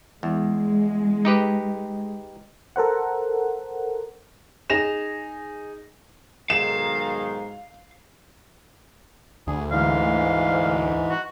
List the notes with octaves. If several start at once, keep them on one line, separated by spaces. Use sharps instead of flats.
E2 G#3
D#4 G4 B4
A4 A#4 C5 F#5
D#4 G#4 A#6 E7 F7
B1 G#2 D#3 F5 E7
D2 G#4
G#2 E3 G#3 F5
F#4